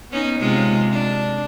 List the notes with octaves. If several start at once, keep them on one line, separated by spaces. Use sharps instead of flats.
B3 C#4 D#4
C3 G#3 F4
D4